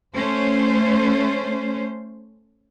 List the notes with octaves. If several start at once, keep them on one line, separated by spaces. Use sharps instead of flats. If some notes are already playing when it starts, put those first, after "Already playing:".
A3 C#4 C5